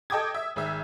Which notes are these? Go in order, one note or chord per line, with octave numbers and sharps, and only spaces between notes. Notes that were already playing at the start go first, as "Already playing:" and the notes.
A4 D#5 G5 D6 D#6 G#6
E5
G#1 G#4 E5